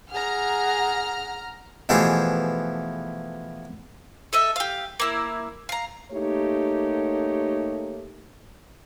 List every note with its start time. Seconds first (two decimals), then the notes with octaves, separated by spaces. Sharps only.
0.12 G#4 F#5 A#5 F6
1.89 B2 E3 F3 A3 G4 G#4
4.33 A4 D#5 E5
4.56 G4 F5
5.00 A#3 E4 A#4
5.69 F5 A#5
6.12 A3 A#3 D#4 G4 C#5